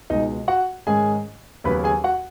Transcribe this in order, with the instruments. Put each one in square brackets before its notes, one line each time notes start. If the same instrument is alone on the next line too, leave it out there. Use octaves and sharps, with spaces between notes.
[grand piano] C#2 B2 G#3 D#4 D#5
F#4 F#5
G#2 D#3 G#3 C#4 G#4 G#5
D#2 C#3 F#3 B3 B4 B5
G#4 G#5
F#4 F#5